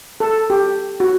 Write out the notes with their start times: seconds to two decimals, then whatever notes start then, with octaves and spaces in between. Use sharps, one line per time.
0.20 A4
0.50 G4
1.00 F#4